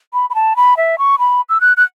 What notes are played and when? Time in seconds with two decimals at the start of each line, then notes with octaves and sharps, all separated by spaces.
0.13 B5
0.30 B5
0.35 A5
0.56 B5
0.77 E5
0.98 C#6
1.19 B5
1.49 E6
1.61 F#6
1.77 F#6